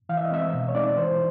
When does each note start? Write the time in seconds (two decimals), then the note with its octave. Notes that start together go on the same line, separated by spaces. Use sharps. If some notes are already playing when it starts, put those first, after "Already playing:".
0.09 E3 F5
0.17 E5
0.25 D#5
0.31 G#3 C4 E5
0.54 B2
0.69 C#5
0.75 G#3 C4 D#4 D5
0.96 E3 C5